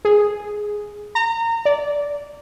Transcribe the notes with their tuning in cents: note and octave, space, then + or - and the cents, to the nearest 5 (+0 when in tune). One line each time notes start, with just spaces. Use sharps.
G#4 +0
A#5 -25
D5 -15